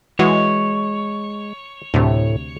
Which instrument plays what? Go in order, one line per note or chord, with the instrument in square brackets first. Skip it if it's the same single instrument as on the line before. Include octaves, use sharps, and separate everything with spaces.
[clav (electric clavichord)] E3 F#4 [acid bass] G#3 [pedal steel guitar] C#5
[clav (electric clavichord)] D2 C3 [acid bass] A2